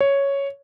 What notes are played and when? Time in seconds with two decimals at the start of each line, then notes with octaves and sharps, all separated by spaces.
0.01 C#5